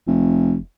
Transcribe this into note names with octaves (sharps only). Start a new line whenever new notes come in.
F1